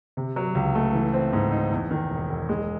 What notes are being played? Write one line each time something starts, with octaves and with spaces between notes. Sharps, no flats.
C3
F#3
C#2
A3
E3
C4
G#2
D#4
E2
D#3
E1
E1
G#3